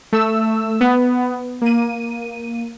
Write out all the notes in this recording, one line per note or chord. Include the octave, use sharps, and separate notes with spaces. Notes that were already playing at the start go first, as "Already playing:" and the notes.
A3 E6
B3
A#3 D#7